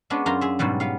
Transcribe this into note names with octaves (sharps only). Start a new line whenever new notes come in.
G#3 B3 C#4 D4
F#2 F4 A#5
G#4 E5
G#2 B2 F#3 G3
B3 F5